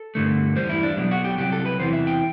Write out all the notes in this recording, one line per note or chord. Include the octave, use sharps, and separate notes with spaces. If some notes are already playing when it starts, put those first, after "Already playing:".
Already playing: A4
G2 D3 A3
E2 B2 G3 C5
E4
D4
B1 B2 F#3 D4
F#4
G4
C2 C3 F#3 G4
A4
B4
E2 C3 E3 B3 C5
E5
G5